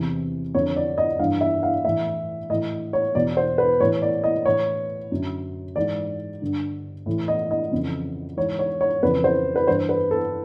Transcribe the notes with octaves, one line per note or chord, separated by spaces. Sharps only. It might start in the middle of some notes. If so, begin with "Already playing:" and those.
Already playing: E2 C3 E3
F2 D3 C#5
D5
D#5
G2 E3 F5
E5
F5
A2 E3 E5
A2 E3 D#5
C#5
E2 B2 D5
C5
B4
A2 E3 C#5
D5
D#5
A2 E3 C#5
F#2 D3
G#2 E3 D5
G2 D3
A2 E3
D#5
D#5
F2 C#3 E3
G#2 E3 C#5
C#5
C#5
F2 C#3 E3 B4
C5
B4
G2 E3 C5
B4
A4